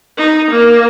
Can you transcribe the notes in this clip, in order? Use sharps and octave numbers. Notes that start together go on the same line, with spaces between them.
D#4
A#3